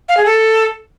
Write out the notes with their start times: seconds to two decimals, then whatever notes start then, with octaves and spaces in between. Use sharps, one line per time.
0.09 F5
0.17 G#4
0.26 A4